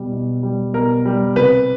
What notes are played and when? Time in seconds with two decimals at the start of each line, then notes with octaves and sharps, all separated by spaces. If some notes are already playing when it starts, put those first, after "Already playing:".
Already playing: B2 G3
0.12 B2
0.43 G3
0.74 B2 A#4
1.05 G3
1.36 C3 B4